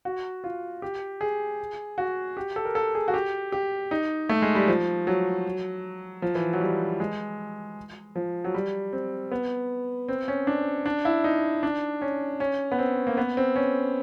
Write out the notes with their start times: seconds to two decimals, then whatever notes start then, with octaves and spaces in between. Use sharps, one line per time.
0.05 F#4
0.44 F4
0.82 G4
1.21 G#4
1.98 F#4
2.37 G4
2.56 A4
2.65 A#4
2.75 A4
2.95 G#4
3.08 F#4
3.14 G4
3.52 G4
3.91 D#4
4.29 A3
4.42 G#3
4.55 G3
4.68 F3
5.07 F#3
6.22 F3
6.35 E3
6.53 F#3
6.61 G3
7.00 G#3
8.16 F3
8.44 F#3
8.54 G3
8.93 C4
9.31 B3
10.09 C4
10.28 C#4
10.47 D4
10.86 D4
11.05 E4
11.24 D#4
11.63 D4
12.02 C#4
12.40 C#4
12.72 B3
12.79 C4
13.07 A#3
13.17 B3
13.37 C4
13.56 C#4